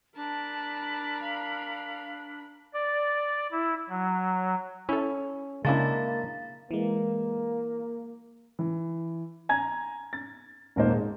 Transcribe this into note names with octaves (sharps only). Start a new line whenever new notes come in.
D4 A#4 A5 B5
F5
D5
E4
F#3
C#4 E4 A4
C#3 G#3 A#3 C#4 D4 E4 F5 A6
E3 G#3 A#3
E3
G#5 A#5 G#6
A6
D#1 G#2 A#3 D#4 C5
G#3